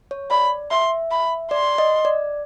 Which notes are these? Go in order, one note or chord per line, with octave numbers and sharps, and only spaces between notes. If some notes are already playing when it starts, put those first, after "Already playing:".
C#5
D5 B5
E5 C6
B5
D5 C6
D#5
D5